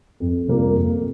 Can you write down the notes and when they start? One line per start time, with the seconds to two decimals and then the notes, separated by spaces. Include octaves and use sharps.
0.20 F2
0.48 C3 G3 A#3 F4
0.76 F2